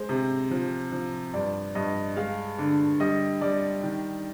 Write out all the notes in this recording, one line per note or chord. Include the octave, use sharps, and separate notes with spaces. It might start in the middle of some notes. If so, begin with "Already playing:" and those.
Already playing: G#3 C5
C3
F3
F3
G2 D5
G2 D#5
G#3 F5
D3
G3 D#5
G3 D5
D#3